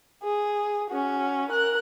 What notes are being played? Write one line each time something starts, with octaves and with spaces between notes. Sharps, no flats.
G#4
C#4 F#4
A#4 F#6